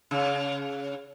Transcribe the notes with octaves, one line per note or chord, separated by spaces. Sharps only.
C#3